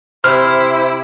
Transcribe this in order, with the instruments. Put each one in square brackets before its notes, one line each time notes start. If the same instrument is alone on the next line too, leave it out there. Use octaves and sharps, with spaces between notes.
[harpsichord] C3 [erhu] E4 [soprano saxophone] C5 [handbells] F6